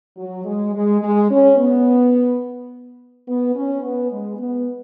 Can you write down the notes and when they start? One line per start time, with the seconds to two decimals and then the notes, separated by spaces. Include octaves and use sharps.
0.17 F#3
0.45 G#3
0.73 G#3
1.01 G#3
1.29 C#4
1.57 B3
3.26 B3
3.54 C#4
3.82 B3
4.11 G#3
4.39 B3